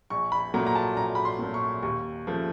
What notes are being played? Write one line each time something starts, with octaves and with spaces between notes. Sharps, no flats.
A#1 C#6
B5
A#2 F#3 A3 A#5
A#5
A5
A#1 A#5
B5
C6
A#2 F#3 A3
C#6
D#2 C#6
C#3 F3 A3